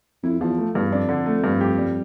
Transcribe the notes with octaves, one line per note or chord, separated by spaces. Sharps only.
F2 E4
E2 F3
A3
E2 G2
F2 D4
D3
A3
G2
G4
G3